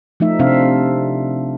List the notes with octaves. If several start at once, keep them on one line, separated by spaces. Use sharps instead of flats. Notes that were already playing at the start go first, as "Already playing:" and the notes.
F3 A3 D#4 E5
C3 C4 D4 E5 F5